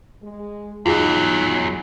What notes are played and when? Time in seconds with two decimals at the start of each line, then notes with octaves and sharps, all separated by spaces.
0.22 G#3
0.86 E2 F#3 D#4 F4 F#4 G#4